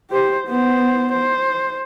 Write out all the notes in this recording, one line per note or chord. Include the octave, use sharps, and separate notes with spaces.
G4 C5
B3 C5
C5